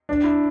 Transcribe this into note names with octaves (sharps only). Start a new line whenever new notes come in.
D4
E4